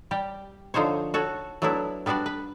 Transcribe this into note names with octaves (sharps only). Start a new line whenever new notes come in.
G3 G4
D3 F3 D#4 C5 C#5
F#4 A4 C#5
F#3 A3 B3 D4 E4
G3 B3 D4 F#4 D5
B4